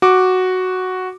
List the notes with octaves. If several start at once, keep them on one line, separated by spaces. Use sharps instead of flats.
F#4 D6